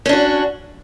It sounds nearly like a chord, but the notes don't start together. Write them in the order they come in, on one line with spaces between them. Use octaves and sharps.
C#4 D4 F#4